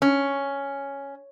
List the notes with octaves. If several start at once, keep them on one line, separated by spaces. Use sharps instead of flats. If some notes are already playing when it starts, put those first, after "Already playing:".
C#4